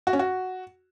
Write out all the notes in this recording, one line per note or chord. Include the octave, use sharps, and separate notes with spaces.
F#4
C#4
F#4